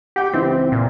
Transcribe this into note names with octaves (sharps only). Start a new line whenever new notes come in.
G4 F#5 G5
C#2 E3 C4 E4
A#2